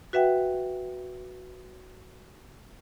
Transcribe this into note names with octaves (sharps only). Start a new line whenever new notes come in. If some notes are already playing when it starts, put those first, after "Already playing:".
F#4 B4 E5 F#5 G5